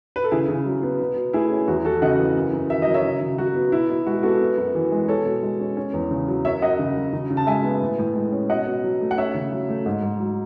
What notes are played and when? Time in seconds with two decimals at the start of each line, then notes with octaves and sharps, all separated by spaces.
0.16 B4
0.24 A4
0.31 C#3 E4 G#4
0.48 C#3
0.66 F#3
0.83 B3
1.00 B2
1.16 B2
1.33 A3 E4 G#4
1.51 C#4
1.68 E2 F#4
1.85 E2 F#4 A4
2.02 C#3 D#5 F#5
2.19 E3
2.36 F#2
2.53 F#2
2.70 D#3 E5
2.82 D#5
2.87 F#3
2.94 C#5 E5
3.04 C#3
3.21 C#3
3.38 F#3 F#4
3.55 B3
3.72 B2 E4
3.90 B2
4.06 G#3 F#4
4.23 B3 F#4 A4
4.40 B3
4.57 F#2
4.75 E3
4.92 G#3
5.08 B2 A4 C#5
5.26 B2
5.43 G#3
5.60 C#4
5.77 C#4
5.94 E2
6.11 C#3
6.28 F#3
6.45 F#2 C#5 E5
6.62 F#2 D#5 F#5
6.79 C#3
6.96 F#3
7.13 C#3
7.30 C#3
7.37 A5
7.47 G#3 E5 G#5
7.64 B3
7.81 A2
7.99 A2
8.16 G#3
8.32 C#4
8.50 B2 D#5 F#5
8.66 B2
8.84 F#3
9.01 A3
9.11 F#5
9.18 C#4 C#5 E5
9.35 C#3
9.52 F#3
9.69 A3
9.86 G#2
10.03 G#2
10.20 F#3